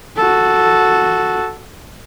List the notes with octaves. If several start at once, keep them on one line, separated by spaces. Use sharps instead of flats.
F#4 A4